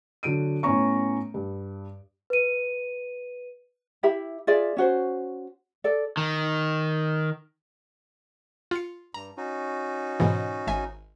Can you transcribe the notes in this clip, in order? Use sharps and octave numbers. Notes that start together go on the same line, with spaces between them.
D3 F#3 D7 D#7
A2 B3 C#4 C#5 A#5 C#6
G2
B4 D#7
E4 G4 E5 B5
F4 G#4 D5 E5
C#4 F#4 C5
A4 D5
D#3
F4 C#7
G2 A#5
C#4 D#4 F#4
G#2 B2 E3
G#1 E5 G#5